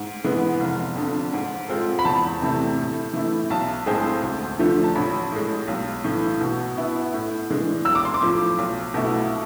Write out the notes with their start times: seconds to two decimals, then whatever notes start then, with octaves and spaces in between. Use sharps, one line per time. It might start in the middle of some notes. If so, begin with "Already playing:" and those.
Already playing: G#2
0.24 E3 G#3 B3
0.60 F1
0.96 F2 D3
1.33 G#2
1.68 G#3 C4 F4 A4
1.99 B5
2.05 E2 A5
2.41 C3 E3 A3
2.78 A2
3.13 E3 A3 E4
3.50 B1 A5
3.86 A2 G#3 C4 G#4
4.23 D2
4.59 D3 F3 A3
4.84 A5
4.95 A1 B5
5.31 A2 G#3
5.68 B1
6.04 A2 E3
6.41 B2
6.77 B3 E4
7.14 A2
7.50 E3 G#3 D4
7.85 B1 E6
7.95 D6
8.05 C6
8.14 D6
8.22 A2 F3
8.58 B1
8.94 B2 A3 E4